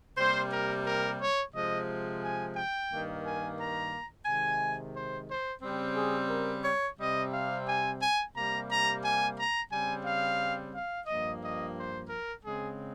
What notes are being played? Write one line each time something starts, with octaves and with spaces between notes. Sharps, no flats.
C3 G3 A#3 C5
A#4
A#4
C#5
C3 F3 G#3 D#5
G#5
G5
G2 D#3 A#3
G#5
A#5
C3 D#3 G#3 G#5
C5
C5
C#3 G3 C4
G#4
A#4
C#5
C3 G3 C4 D#5
F5
G#5
G#5
C3 G3 A#3 A#5
A#5
G#5
A#5
C#3 G3 C4 G#5
F5
F5
G2 F3 A#3 D#5
D#5
C5
A#4
C#3 G#3 C4 G#4